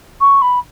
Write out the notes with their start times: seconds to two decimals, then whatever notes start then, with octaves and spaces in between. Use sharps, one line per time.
0.21 C#6
0.42 B5